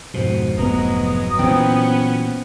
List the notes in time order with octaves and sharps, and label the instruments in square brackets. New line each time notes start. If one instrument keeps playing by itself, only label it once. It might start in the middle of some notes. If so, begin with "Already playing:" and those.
[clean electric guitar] F2 G#2 C5 [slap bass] B2
[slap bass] F1 B3 [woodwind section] B2 A#5 D#6 [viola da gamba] F#3 G#3
[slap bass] A#2 E3 F#3 [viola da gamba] B3 C#4 [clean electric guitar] C5 G5